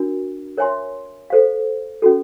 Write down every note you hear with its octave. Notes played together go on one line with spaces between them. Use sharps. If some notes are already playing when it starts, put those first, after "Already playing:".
Already playing: D4 F#4 A#4
A#4 C#5 E5 G#5 C6
A4 C5 F5
C#4 F#4 A4